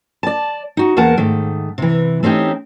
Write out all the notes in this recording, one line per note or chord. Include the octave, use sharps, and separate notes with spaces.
D5 A5
D#4 F#4
E2 A#3 A#4 F#5 A5
G#2 D#3 A3
C3 E3
A3 C4 C#4 D#4 G4